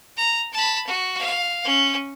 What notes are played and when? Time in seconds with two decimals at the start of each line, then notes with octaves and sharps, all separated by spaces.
0.17 A#5
0.53 A5 B5
0.87 F#4
1.19 F5
1.65 C#4